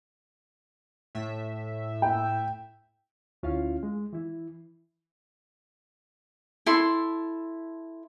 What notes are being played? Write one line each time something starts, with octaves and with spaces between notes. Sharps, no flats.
A2 E5
G5
D2 C#4 E4 F4 F5
G#3
E3 E4
E4 A4 C6